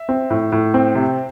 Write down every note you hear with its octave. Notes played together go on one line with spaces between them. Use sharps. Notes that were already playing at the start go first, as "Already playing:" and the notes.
Already playing: E5
C4
A2
A2
C4
C3